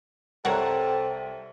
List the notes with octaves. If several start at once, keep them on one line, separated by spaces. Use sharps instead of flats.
C2 C4 A4 A#4 C#5 F#5 C7